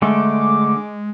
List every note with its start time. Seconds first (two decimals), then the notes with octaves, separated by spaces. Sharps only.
0.02 D3 G#3 A3 D6